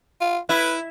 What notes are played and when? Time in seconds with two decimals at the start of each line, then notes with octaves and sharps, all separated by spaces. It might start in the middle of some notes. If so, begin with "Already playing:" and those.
0.21 F4
0.49 E4 B4